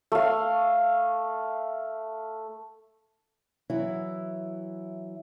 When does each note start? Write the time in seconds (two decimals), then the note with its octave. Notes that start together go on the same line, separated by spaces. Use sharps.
0.12 A3 F5
3.70 E3 F#3 E4